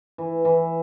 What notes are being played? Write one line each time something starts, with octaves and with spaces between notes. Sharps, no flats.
E3
E3